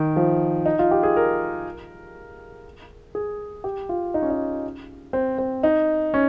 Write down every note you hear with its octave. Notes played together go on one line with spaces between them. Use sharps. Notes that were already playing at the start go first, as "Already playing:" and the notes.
Already playing: D#3
F3
D#4
F4
G4
G#4
A#4
G#4
G4
F4
D#4
C#4
D#4
C4
C4
D#4
C#4